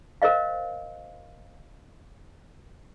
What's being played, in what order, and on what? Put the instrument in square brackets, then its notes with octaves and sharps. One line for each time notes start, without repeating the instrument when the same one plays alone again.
[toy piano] A#4 C5 D#5 F5